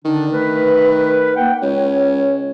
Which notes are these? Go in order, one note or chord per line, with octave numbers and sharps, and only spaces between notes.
D3 D#3 D4
A3 A#4 B4
A#3 F#5 G5
C#2 C#5